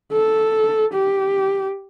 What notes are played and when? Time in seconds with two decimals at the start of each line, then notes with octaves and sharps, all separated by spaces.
0.13 A4
0.93 G4